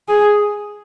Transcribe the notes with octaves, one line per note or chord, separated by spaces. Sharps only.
G#4